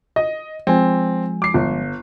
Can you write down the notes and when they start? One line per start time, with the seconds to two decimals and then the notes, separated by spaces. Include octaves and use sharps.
0.16 D#5
0.67 F3 G#3 C4 G#5
1.42 D6 C7
1.54 G1